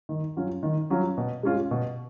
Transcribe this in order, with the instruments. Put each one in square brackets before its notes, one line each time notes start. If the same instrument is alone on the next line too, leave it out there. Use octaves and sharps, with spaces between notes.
[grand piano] D#3
F#3 C#4 F4
D#3
F#3 C#4 F4
B2
G#3 C#4 F4
B2